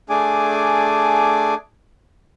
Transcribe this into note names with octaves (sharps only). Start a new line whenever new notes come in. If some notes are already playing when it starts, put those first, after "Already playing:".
A3 D4 G#4 G#5 D6